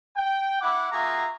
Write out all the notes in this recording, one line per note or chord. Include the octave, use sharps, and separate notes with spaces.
G5
E4 F#5 D6
A#3 F4 F#4 G#4 E5 A#5